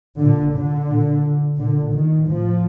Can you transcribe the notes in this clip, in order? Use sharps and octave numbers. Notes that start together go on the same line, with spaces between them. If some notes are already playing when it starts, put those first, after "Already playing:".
A#2 D3
D3
A#2
A#2 D3
D#3
A2 F3